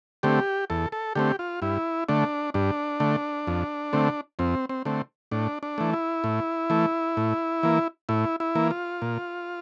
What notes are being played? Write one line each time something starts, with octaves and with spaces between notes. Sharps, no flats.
D3 A3 C4 G4
E2 A4
A4
D3 A3 C4 G4
F4
G2 E4
D3 A3 D4
G2 D4
D3 A3
F2
D3 A3 C4
F2 C4
C4
D3 A3 C4
A2 D4
D4
E3 A3
E4
A2
E3 A3
A2
E3 A#3
A2 E4
E4
E3 A#3
F4
A#2